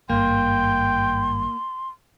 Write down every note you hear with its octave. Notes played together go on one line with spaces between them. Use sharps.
G#1 G2 A#3 G5 C6